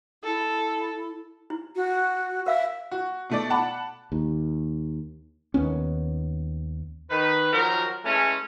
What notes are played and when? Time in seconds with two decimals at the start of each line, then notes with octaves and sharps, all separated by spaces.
0.24 E4 A4
1.50 E4
1.76 F#4
2.46 A#4 E5 F5 E6
2.91 F#4
3.30 B2 A3 D5
3.50 F#5 A5 B5 D6
4.12 D#2
5.54 D#2 B3 C#4
7.10 D#3 B4
7.52 D#3 F3 F#3 A#4
8.05 E3 G#3 A3 C#4